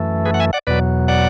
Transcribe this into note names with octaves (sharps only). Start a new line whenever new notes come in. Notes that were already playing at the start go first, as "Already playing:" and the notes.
Already playing: F#2 E3 A3
G#4 B4
F#5
E5 G#5
D5 F#5
E2 B2 F#3 B4 D5
D5 F#5